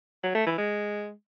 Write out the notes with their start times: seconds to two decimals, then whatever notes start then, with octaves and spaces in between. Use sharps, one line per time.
0.23 F#3
0.35 A3
0.47 E3
0.58 G#3